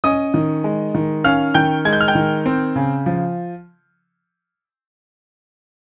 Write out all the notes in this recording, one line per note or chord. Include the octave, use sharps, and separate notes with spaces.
C#4 D#5 D#6
D#3
G#3
D#3
C#4 F5 F6
D#3 G5 G6
G#3 G#6
G6
F6
G5 G6
D#3
C4
C#3
F3